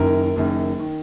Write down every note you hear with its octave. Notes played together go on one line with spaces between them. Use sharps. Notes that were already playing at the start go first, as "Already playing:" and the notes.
Already playing: F#1 F#2 D#3 A#4
F#1 F#2 D#3
D#3